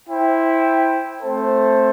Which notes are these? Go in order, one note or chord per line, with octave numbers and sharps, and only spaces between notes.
E4 C5 G5
A3 C4 A4 C5